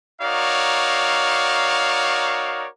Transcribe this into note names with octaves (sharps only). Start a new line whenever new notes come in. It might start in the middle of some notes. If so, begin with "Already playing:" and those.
D#4 F#4 A#4 C#5 D5 F5